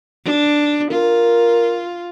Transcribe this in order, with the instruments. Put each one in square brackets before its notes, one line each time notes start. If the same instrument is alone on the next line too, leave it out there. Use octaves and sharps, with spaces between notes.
[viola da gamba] D4
[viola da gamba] F4 [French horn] A#4